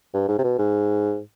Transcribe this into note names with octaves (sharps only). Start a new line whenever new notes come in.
G2
G#2
C3
B2
G#2